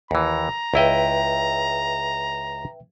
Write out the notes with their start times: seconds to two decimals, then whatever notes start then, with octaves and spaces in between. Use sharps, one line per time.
0.11 D#2 E3 A#5
0.74 C#2 E4 B4 D#5 E5 G5